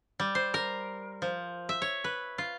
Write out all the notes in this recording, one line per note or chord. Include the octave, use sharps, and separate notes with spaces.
G3
C5
A#4
F3
E5
C#5
B4
F4